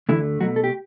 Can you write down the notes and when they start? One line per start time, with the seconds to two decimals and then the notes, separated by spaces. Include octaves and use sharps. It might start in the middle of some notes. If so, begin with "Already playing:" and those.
0.09 D2 D3 E3 A3 E4
0.40 B1 B2 F#3 A3 F#4
0.56 A4
0.64 G4